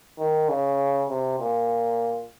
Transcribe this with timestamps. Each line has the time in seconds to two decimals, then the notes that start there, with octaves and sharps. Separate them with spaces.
0.19 D#3
0.49 C#3
1.09 C3
1.40 A#2